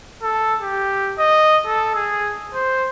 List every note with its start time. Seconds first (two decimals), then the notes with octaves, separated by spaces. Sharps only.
0.22 A4
0.62 G4
1.18 D#5
1.67 A4
1.95 G#4
2.54 C5